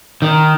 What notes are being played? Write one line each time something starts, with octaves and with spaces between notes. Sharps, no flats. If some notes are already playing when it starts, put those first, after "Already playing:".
D#3